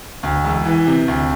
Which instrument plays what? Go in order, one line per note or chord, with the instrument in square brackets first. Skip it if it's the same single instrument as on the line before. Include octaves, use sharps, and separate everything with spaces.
[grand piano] D2
E1
E3
C3
D2